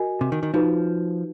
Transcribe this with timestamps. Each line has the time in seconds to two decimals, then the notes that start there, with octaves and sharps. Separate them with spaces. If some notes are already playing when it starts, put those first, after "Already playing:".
Already playing: F#4 A#4 D#5 G#5
0.21 C3
0.32 D#3
0.43 D#3
0.54 F3 D#4 F#4 B4